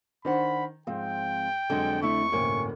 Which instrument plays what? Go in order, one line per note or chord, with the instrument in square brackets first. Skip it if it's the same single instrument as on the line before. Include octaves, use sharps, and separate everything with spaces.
[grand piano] D#3 [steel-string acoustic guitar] D4 C5 F#5 [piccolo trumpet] B5
[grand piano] G#2 [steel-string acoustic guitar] F3 C4 [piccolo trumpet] G5
[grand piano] F2 [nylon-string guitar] D3 [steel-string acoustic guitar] F#3 G#3
[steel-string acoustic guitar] A3 E4 [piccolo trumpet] C#6
[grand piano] D1 G1 C#4 [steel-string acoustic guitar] C3 G#5 [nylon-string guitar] A#3 C4